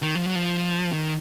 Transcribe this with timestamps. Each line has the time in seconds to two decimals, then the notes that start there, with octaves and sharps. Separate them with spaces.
0.02 D#3
0.15 F3
0.26 F#3
0.35 F3
0.93 D#3